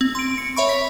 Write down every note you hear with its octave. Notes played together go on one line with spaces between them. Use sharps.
C4
C6 D7
C#7
C#5 E5 B5 C#6
B6